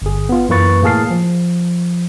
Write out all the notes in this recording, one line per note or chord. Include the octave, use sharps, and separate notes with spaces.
G1 G#4
B3 F4
F#2 E3 A#3 B4 C#6 A6
A2 A#3 G#4 A5 F6 C7
F3